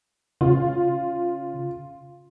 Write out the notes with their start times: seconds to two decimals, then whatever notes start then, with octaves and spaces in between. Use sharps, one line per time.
0.41 C#3 F4